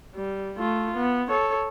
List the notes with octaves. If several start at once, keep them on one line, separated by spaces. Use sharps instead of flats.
G3
A3 F4
B3
A4 C#5